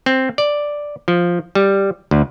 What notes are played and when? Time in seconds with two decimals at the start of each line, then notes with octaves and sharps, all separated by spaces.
0.06 C4
0.38 D5
1.08 F3
1.55 G3
2.11 D2